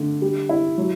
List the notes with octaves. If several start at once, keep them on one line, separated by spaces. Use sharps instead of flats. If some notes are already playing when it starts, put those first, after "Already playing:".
Already playing: D3 A3
G3
E4
F#3